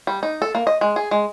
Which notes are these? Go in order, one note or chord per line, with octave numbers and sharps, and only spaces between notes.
G3
D#4
A4
A#3
D#5
G#3
G#4
G#3